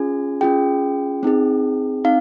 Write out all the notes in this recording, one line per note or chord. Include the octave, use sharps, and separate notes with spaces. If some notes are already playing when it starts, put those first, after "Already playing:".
Already playing: C#4 F4 G#4 G#5
C#4 F4 G#4 G5
C4 D#4 G#4
C4 D#4 F5